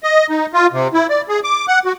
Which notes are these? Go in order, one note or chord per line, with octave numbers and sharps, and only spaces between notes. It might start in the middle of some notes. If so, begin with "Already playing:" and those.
D#5
D#4
F4
C3
E4
D5
G#4
D6
F#5
F#4